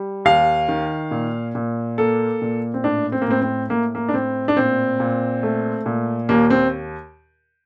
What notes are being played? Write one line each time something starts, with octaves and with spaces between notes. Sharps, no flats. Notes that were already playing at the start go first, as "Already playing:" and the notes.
Already playing: G3
D#2 F5
D#3
A#2
A#2
A#3 A4
A#2
C4
A2 D4
C4
A#3
A2 C4
C4
A2 A#3
A#3
D4
A2 C4
D4
A#2 C4
A#2
A3
A#2
D#2 A#3
C4